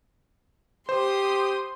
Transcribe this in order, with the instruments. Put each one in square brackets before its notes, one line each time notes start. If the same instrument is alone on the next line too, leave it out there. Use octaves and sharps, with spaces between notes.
[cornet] G4 [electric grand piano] C5 [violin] C6 D#6